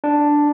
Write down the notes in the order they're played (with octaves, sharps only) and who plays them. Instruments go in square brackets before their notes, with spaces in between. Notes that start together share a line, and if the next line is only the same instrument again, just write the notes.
[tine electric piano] D4